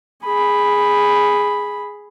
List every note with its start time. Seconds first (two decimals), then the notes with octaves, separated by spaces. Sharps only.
0.25 G#4 B5